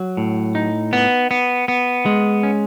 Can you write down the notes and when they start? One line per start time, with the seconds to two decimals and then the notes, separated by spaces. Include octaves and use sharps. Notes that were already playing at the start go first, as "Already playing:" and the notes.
Already playing: F#3
0.17 A2
0.55 D#4
0.93 B3
1.31 B3
1.68 B3
2.06 G#3
2.43 C#4